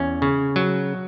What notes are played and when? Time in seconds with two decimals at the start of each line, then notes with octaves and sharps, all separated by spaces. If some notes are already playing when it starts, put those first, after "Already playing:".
Already playing: E2 C#4
0.22 C#3
0.56 F#3